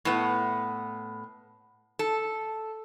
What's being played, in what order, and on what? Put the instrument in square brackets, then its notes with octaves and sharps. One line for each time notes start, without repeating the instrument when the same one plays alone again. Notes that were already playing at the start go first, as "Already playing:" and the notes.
[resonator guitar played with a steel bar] A2 B3
A4